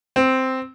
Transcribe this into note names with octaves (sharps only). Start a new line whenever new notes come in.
C4